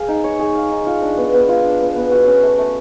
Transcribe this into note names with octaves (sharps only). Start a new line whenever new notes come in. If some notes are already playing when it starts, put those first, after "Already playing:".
Already playing: G#4 F5
D#4
C#5
G#4
F5
D#4
F4
D4
B3
B3
F4
D4
B3
B3
F#4
C#4
A3
A3